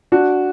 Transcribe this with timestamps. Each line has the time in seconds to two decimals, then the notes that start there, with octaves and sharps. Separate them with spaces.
0.12 D4 F#4